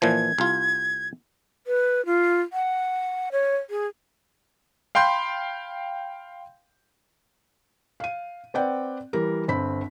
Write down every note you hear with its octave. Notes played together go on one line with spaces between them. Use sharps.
A#2 E3 F3 G#6
C2 F4
B4
F4
F#5
C#5
G#4
F5 G5 B5 C6 G6
F5 D#7
C4 B4 D5 F#5 G5
E3 G3 A#4
G1 C4 B5 B6